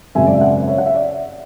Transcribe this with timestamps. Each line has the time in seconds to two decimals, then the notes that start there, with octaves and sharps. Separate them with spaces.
0.15 G#1 F#2 C#3 E5 G#5
0.26 D5
0.34 E5
0.41 D5 F#5
0.68 C#5 E5
0.78 F#5
0.86 E5
0.94 D5